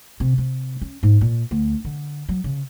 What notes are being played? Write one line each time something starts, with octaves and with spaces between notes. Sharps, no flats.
C3
C3
C#4
G#2
A#2
D2
D3
F#3
C#3